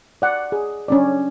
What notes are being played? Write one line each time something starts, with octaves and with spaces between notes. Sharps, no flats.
D5 F#5
G#4
C#4 D4 D5